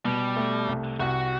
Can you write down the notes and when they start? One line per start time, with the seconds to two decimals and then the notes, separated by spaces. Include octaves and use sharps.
0.05 B2 G3
0.36 A3
0.68 C2
1.00 C2 F#4